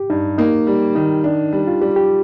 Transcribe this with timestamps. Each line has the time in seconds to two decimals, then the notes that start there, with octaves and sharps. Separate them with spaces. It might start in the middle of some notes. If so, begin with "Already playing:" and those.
Already playing: G4
0.10 G2 D#4
0.38 A#3 D#4
0.67 G3
0.95 D#3 D#4
1.24 D4
1.53 G3
1.68 F4
1.81 G3 G4
1.96 G4